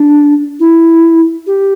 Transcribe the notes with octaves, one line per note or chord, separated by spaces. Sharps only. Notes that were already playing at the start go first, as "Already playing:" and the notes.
Already playing: D4
E4
G4